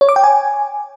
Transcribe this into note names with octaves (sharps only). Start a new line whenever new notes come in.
C#5
D6
G5
G#5